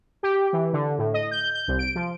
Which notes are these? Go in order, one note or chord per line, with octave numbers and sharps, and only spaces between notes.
G4
E3
D3
A2
D#5
G6
G6
C2
D7
F3